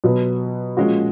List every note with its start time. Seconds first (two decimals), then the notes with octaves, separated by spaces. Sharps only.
0.04 B2 F#3 B3
0.77 A#2 F3 G#3 C#4 F#4